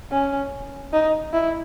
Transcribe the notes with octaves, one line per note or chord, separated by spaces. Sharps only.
C#4
D#4
E4